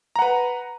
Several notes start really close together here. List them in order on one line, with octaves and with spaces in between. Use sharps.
A#5 F#5 B4